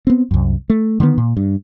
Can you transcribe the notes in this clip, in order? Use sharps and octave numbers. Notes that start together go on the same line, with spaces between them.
B3 C4
C2 F#2
A3
D3 D#3 G#3 B3
A#2
G2